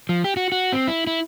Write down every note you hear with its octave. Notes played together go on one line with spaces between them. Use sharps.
F3
G4
F#4
F#4
C4
E4
E4